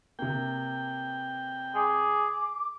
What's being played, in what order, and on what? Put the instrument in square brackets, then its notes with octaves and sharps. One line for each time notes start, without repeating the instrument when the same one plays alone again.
[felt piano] C3 A#3 [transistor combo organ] G5
[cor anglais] G#4 [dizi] D6